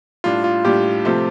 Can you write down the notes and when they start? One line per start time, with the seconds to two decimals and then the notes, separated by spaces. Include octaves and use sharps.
0.24 A2 G3 D4 F4
0.44 F4
0.64 A2 G3 D4 G4
1.05 C3 F3 A3 C4